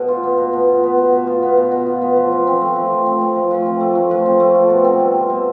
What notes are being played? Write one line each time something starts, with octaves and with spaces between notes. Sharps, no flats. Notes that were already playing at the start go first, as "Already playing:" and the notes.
Already playing: B2
F4
B3
B2
B2
F4
B3
B2
B2
F4
B3
B2
B2
F4
B3
F3
F3
C4
A3
F3
F3
C4
A3
F3
F3
C4
A3
F3
F3
C4
A3
F4
B2
C4
G3
F4
B2